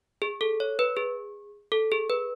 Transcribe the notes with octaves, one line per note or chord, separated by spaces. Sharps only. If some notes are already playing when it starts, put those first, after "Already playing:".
G#4
A4
C#5
B4
G#4
A4
G#4
B4